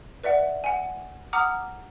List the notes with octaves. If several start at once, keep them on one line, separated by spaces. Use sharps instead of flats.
B4 D5 E5 F#5
F#5 G#5
F#5 A#5 D6 D#6 F6